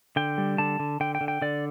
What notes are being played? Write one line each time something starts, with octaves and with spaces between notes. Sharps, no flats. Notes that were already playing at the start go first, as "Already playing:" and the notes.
D3 G5
G3
D3 A5
D3
D3 G5
G5
D3
G5
D3 D5